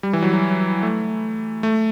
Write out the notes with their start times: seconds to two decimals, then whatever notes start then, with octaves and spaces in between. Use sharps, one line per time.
0.03 G3
0.13 E3
0.22 F#3
0.33 F#3
0.83 A3
1.63 A3